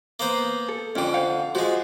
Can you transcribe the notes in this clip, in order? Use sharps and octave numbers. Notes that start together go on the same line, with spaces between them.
A#3 B3 C5
A4
F2 D3 C#4 G5
C5 F5 F#5
F3 G#3 F#4